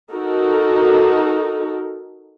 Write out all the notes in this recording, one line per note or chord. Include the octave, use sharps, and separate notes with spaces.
D#4 F#4 A4 A#4